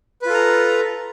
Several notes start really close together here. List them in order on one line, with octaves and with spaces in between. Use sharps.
B4 F4 A4 A#5